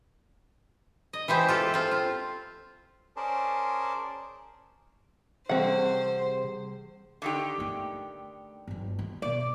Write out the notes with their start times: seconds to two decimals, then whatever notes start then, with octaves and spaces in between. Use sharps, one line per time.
1.13 D#5
1.28 E3 G#3 G4 C5
1.48 F4 G4 A4
1.74 C4 F4
1.91 F4
3.16 C#4 G#4 A#4 C5 D5 A5
5.49 C3 E3 G3 C4 G#4 C5 F#5
7.22 D3 D#3 G4
7.58 A3 D#4
8.67 G1 F#3
8.99 D#3
9.22 B2 D5